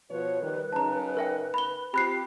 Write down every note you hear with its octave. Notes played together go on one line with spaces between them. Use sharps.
B2 F3 B4 C#5
D#3 G3
F#2 C#3 D#4 A5 A#5
A#4 E5 G5
B5 G7
C4 F4 G4 B5 F#6 C7